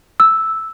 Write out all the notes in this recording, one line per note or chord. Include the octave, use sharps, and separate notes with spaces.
E6